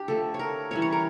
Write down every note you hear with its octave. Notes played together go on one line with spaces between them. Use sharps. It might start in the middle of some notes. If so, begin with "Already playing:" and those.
Already playing: D4 G4
D3 F3 A3 A4
C#5
A#4
E3 G3 C#4 C#5
C#5
A#4